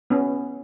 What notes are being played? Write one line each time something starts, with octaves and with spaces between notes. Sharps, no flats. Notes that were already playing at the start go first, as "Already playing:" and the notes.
B3 C#4